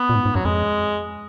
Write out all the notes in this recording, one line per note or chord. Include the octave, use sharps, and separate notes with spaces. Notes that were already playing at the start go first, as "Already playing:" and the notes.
Already playing: B3
A#2
G#2
G#2
F#2 F#3
F2 G#3